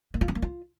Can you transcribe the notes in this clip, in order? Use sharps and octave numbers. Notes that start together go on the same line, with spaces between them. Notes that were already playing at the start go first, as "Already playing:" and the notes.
A#3
F4
B3
A#3
F4